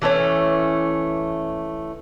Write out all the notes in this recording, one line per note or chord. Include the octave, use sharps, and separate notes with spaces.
E3 A3 C4 C#4